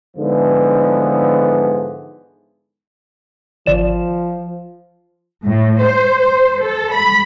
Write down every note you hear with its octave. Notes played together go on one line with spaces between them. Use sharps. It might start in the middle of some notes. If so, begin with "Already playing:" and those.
G#2 D3 E3 F3 B3
G#1 F3 D5 E7
A2
C5
C5
A4
B5